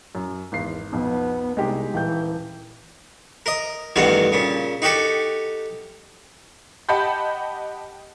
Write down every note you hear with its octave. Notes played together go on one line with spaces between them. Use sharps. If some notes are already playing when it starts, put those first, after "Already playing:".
F#2
G#1 E2 C7
B1 F2 B3
C2 G#3 D#4 G4
D#1 E3 G5 G6
A#4 D#5
A1 E2 G2 D#3 F#4 F5
A#2 C#3
D#4 F#4 G4 A4
G4 D#5 F#5 A5 B5 G6